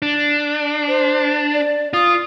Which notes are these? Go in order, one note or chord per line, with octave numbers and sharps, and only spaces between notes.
D4
C5
D5
F4 D#6